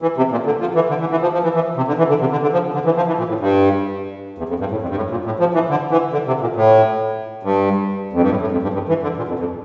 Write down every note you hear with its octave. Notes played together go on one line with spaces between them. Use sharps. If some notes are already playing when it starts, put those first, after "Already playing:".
E3
C3
A#2
D3
F3
E3
D3
E3
E3
F3
F3
E3
E3
C3
D3
E3
D3
C3
D3
D3
F3
D3
E3
F3
E3
A#2
A2
G2
E2
F2
G2
A2
F2
G2
A2
A#2
A2
F3
E3
D3
E3
D3
C3
A#2
A2
G2
F2
G2
A2
A2
F2
G2
G2
E3
D3
A#2
F2
F2